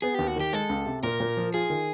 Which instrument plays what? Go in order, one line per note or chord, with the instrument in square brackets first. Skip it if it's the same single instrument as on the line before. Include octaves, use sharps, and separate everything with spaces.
[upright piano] B3 [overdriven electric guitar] G#4
[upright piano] D#2 [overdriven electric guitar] G4
[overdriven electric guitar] F#4
[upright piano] D#3 [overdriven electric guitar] G4
[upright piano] G#3 [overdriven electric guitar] A4
[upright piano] C#2
C3
[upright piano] A#2 [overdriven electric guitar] A#4
[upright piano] A#2
F3
[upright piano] F4 [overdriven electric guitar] G#4
[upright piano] D#3